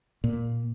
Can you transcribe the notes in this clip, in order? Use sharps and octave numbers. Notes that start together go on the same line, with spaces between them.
A#2